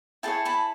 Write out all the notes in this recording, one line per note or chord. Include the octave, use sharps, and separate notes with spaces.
E4 G#4 C#5 G5 A5
A5 B5